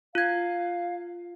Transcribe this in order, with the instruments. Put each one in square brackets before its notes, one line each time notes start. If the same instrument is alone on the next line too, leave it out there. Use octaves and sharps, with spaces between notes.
[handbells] F4 G#6 [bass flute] F5